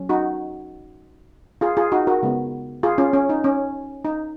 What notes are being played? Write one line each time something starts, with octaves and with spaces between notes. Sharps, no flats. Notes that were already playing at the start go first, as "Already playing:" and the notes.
Already playing: F#3 C#4
D#4 F#4
F4 G#4
F4 G#4
D#4 F#4
F#4 A#4
C#3 G#3 B3
F4 G#4
C#4 F4
C#4
D#4
C#4
D#4